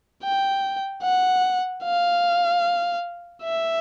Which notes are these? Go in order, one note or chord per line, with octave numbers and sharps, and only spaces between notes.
G5
F#5
F5
E5